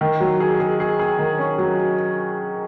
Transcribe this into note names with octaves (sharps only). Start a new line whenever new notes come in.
D#3
F#3
G#4
G#4
G#4
G#4
D#3
C#4
F#3